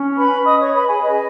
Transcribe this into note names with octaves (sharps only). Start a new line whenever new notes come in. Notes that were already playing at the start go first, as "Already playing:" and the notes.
Already playing: C#4
B4 B5
D#5 D#6
C#5 C#6
B4 B5
G#4 G#5
C#4 G#4 B4 D#5